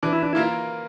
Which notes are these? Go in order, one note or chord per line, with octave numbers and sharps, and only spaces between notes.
E3 D4
E4
D4
A#3 E4 F4 A#4